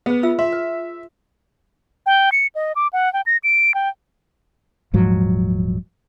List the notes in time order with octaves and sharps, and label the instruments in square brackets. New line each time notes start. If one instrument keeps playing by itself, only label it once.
[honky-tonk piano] B3 [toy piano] G#4 C5
[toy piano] F4 E5 E6
[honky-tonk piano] E5 [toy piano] C6
[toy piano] B4
[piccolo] G5
C#7
D#5
D6
F#5
G5
A#6
D7
G5
[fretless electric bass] D#1 G#2 F3 F#3